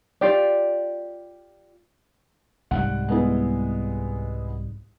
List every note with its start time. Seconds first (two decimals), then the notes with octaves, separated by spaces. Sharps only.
0.21 F4 G4 D5
2.71 C2 G#2 G3 F#5
3.09 G#3 B3 E4